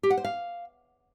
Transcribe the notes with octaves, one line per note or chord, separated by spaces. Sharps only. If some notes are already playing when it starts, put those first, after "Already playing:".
G4
F#5
C5
F5